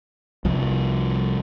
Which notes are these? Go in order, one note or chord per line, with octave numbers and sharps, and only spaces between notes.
C2 F3